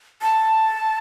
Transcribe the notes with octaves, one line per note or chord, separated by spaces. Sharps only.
A5